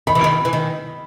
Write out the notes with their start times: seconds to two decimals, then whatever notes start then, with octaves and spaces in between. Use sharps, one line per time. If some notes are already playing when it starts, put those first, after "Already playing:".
0.07 D#3 B5
0.15 E3
0.24 D#3
0.45 E3
0.53 D#3